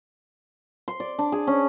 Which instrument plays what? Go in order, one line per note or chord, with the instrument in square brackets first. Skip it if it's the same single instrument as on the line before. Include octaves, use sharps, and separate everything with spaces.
[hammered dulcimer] C6
D5
D4
G#4
C#4